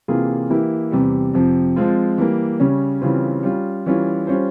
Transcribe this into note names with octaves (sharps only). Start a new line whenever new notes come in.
C3 E3 A#3 F4 G#4
E3 A#3 E4 G4
E2 C3 G3
F2 C3 F3
F3 G#3 C4 F4
E3 G3 A#3
C#3 G3 C#4
C#3 E3 G3 C4 F4
G3 C#4 F4
E3 G3 C#4 F4
G3 C#4 F4 C5